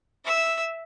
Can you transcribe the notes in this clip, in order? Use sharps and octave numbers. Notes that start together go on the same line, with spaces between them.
E5 E6